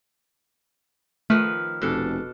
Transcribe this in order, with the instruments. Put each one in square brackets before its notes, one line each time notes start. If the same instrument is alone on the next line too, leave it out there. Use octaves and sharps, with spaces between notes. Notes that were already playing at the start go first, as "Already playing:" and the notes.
[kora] D#3 F3 B4 [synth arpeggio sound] A3 [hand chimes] F6
[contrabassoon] F1 [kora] B2 D4 A4